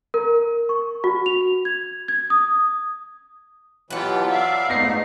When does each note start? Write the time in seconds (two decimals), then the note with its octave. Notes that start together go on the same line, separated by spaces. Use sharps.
0.14 A#4
0.69 C#6
1.04 F#4
1.26 F7
1.65 G#6
2.08 G#6
2.30 D#6
3.90 B2 E3 F#3 F4 G4 B4 F#5 A5
4.31 D5 E5 F5
4.69 G#2 A3 B3 D#4 A#6 C7